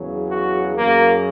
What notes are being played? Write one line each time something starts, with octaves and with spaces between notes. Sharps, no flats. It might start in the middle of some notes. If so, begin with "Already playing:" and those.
Already playing: E2 C#3 F#3
F#4
F#2 C#3 F#3 A#3